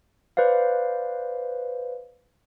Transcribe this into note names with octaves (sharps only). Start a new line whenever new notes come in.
B4 C5 D5 F5